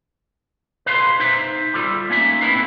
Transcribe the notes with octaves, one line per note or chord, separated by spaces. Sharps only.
B4 F5 A#5 C6
D#4 C5 E5
G3 F4 A4
A#3 C#4 D#4 E5
A#3 C4 E4 A4 B4 F5